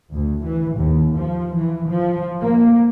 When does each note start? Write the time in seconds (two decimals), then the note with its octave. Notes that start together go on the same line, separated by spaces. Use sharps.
0.13 D2
0.45 E3
0.78 D#2
1.18 F3
1.56 E3
1.89 F3
2.43 A#3